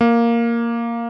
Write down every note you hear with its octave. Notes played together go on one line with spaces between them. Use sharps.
A#3